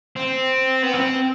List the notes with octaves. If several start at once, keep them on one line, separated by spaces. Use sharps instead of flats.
C4
B3
C4